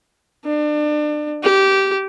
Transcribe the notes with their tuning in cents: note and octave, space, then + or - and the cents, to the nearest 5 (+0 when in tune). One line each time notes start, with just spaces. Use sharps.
D4 +30
G4 -15